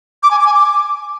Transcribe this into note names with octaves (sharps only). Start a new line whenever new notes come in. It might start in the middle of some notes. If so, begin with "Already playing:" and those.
D6
G#5
D6
G#5
D6